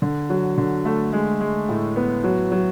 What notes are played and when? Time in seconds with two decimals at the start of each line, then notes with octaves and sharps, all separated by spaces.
0.02 D3
0.30 F#3
0.57 D3
0.85 A3
1.13 G#3
1.41 G#3
1.69 A2
1.96 B3
2.24 F#3
2.51 F#3